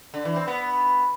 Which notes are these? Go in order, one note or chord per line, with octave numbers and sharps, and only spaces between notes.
D3
E3
C4
B3